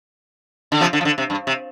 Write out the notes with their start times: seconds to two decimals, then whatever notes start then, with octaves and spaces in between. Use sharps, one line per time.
0.72 D3
0.81 C3 F3
0.93 D3
1.01 F3
1.05 D3
1.18 C3
1.30 G2
1.47 C3